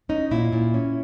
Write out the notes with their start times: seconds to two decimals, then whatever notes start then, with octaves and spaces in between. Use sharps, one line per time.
0.09 C#4 D#4
0.31 A#2 E4
0.53 A#2
0.74 C#4